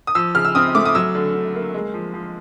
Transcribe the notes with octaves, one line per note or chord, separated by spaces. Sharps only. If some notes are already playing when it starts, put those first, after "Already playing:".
D#6
F3 E6
C#3 F6
E6
C4 D#6
A3 D6
D#6
F#3 E6
D3
D3
A#3
G#3
F3
F3